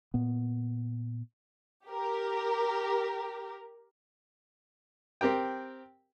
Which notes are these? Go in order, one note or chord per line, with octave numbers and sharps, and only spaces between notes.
A#2 B3
G4 A#4
C4 G4 A#4 G5